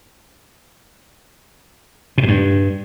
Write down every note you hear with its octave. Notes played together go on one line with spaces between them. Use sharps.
B2
G#2
G2